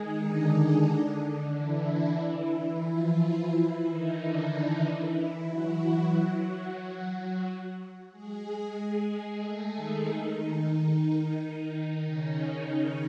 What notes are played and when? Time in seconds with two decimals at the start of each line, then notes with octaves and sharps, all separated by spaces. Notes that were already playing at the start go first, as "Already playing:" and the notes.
Already playing: D#3 G#3 D#4 G#4
0.24 D3 D4
1.55 E3 E4
2.87 F3 F4
3.52 E3 E4
3.85 D#3 D#4
4.18 D3 D4
4.84 E3 E4
5.49 F#3 F#4
8.12 G#3 G#4
9.43 A3 A4
9.76 D#3 D#4
11.40 D#3 D#4
12.06 C#3 C#4